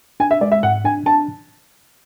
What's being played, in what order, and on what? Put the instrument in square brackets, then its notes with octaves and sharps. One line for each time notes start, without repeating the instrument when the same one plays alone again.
[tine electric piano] D4 [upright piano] G#5
[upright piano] E5
[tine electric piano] G#3 [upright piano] D5
[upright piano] E5
[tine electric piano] G#2 [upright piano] F#5
[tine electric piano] D4 [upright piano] G#5
[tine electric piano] D4 [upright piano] A5